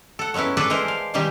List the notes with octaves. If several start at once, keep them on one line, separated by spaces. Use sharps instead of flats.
A4 F#5
F#3 G#3 B3 C#4 E4
D4 G#4 A4 B4 D5
E3 G#3 E4 A#4 C5
F5
B2 D#3 E3 G3 D#4 G4